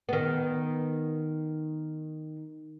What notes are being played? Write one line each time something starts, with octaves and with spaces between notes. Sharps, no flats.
D#3 B3